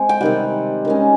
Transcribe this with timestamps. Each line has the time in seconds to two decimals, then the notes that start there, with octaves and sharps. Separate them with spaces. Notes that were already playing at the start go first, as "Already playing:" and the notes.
Already playing: G#3 C4
0.09 G5
0.21 C3 D#3 G3 F#5
0.85 D#3 G#3 C#4